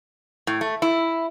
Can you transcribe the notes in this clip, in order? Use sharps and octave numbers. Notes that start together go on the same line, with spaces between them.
A2
A3
E4